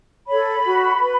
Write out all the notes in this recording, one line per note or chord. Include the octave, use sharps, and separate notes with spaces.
A4 C#5 B5
F#4
B4